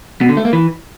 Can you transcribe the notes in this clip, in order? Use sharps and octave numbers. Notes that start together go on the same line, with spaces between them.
B2
D3
A3
A#3
E3